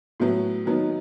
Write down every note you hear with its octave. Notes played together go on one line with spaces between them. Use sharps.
A2 F#3 B3
D#3 F#3 B3 D#4